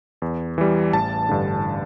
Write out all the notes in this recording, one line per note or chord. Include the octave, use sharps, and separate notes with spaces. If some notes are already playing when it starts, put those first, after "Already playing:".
E2
E3 G3
A1 A5
G2 D3